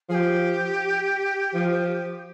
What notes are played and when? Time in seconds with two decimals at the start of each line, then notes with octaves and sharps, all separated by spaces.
0.09 F3 G#4
0.14 G4
1.54 F3